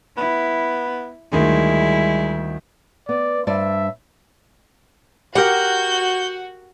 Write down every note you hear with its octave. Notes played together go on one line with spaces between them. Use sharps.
B3 E4
D2 D#3 G3 G#3 E4
B3 D5
G2 C5 D5 E5
F#4 G4 A#4 F#5 G6